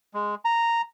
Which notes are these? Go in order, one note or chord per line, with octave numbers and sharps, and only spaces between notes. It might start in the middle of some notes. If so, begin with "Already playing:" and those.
G#3
A#5